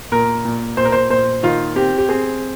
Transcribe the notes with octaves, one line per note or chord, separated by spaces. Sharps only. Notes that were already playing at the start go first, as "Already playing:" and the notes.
A#2 A#4
A#2
A#2 C5
A#4
C5
A#2 C5
D#3 F4
C4 G4
G4
C4 G#4